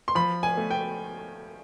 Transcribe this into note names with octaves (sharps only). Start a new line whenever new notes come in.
C6
F3 B5
G#5
A3
G5